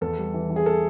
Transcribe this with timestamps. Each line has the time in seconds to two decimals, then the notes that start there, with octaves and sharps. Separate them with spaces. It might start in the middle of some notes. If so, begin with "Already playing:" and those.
0.01 E2 A4
0.18 G3
0.34 E3
0.50 E3
0.56 G#4
0.66 A4